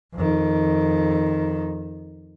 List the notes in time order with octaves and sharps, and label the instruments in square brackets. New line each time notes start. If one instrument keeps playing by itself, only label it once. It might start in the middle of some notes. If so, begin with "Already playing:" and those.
[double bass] F2 D#3